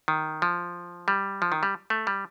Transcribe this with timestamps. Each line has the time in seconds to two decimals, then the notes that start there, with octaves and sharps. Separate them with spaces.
0.08 D#3
0.42 F3
1.08 G3
1.42 F3
1.52 D#3
1.63 G3
1.90 A3
2.07 G3